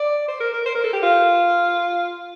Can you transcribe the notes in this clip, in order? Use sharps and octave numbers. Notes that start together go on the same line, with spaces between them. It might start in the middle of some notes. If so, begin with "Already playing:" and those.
Already playing: D5
C5
A#4
A#4
C5
A#4
A4
G4
F4